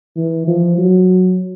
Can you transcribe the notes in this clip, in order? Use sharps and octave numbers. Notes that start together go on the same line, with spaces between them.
E3
F3
F#3